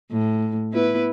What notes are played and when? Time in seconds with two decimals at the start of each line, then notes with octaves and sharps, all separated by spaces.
0.12 A2
0.72 B3 E4 B4